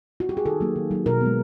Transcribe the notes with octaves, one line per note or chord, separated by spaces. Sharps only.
F#4
G4
G#4
D#3 A4
F#3 A#3
D#3
F#3 A#3
B2 A#4
G#3 B3